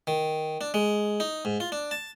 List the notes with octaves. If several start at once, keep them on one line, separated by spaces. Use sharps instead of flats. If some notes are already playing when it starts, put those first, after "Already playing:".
D#3
D4
G#3
D#4
G#2
F4
D4
A5